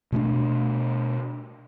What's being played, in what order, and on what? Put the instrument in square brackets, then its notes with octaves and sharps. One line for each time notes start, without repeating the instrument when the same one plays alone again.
[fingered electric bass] B2 A3 C#4 D4